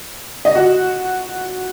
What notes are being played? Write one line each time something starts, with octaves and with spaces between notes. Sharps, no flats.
D#5
F#4 F#5